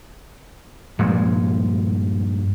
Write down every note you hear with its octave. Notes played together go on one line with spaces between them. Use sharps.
G2 A#2 F3 G#3